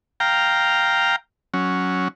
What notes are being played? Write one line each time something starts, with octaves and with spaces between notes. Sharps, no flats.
F5 G5 A#5
F#3 C#4